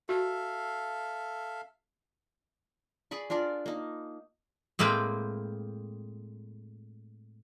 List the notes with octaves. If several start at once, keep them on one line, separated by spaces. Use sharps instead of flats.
F#4 A4 E5 F5
G#4 D5 B5 C#6
D4 F4 A#4 D5
A#3 D#4
A2 G#3 A#3 C4 B4 G5